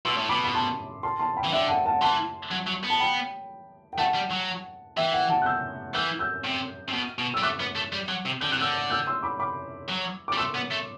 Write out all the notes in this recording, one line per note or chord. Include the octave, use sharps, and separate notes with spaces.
B2 C6 E6
A2
B2 B5 D6
B5
A5 C6
A5 C6
A5 C6
G5 B5
E3
D3 E5 G5
F#5 A5
F#5 A5
E3 A5 C6
F#3
F#3
B3
A5
G5 B5
G5
A3 F#5 A5
G3
F#3
E3 E5 G5
F#5
F#5 A5
F#6
E6 G6
E3 E6 G6
E6 G6
C3
C3
B2
B2
G3 E6
A3 D6 F#6
B3
A3
G3
F#3
C3
D3 G6
C3 F#6
D3 E6 G6
E6 G6
C6 E6
B5 D6
B5 D6
F#3
D6
G3
A3 C6 E6
B3
A3